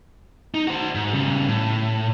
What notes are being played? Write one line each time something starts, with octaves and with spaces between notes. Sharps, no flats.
D#4
F#4 C5
G#2
C#3 G3
A2